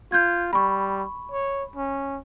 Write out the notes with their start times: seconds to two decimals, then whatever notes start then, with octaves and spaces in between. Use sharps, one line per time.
0.12 F4 G6 G#6
0.53 G3 B5 C#6
1.31 C#5
1.76 C#4